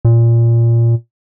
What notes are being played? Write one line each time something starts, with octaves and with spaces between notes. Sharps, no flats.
A#2